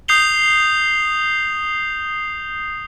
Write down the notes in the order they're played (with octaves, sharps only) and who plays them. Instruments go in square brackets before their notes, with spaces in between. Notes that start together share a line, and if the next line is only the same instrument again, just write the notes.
[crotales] D#6 G6 C7 F7 G7